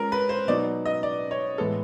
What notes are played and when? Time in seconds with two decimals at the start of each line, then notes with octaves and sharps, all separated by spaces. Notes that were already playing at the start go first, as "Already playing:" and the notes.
Already playing: G#3 C#4 F4 A#4
0.12 B4
0.29 C5
0.48 B2 F#3 B3 D#4 F#4 D5
0.85 D#5
1.03 D5
1.31 C#5
1.58 A2 E3 G#3 B3 A4